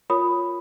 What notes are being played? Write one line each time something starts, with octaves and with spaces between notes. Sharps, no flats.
F4 A#4 C#5 B5 D#6